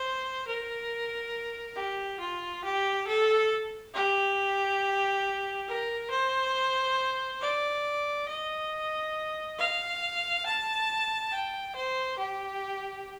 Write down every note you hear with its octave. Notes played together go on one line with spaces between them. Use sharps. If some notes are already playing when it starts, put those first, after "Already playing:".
Already playing: C5
A#4
G4
F4
G4
A4
G4
A#4
C5
D5
D#5
F5
A5
G5
C5
G4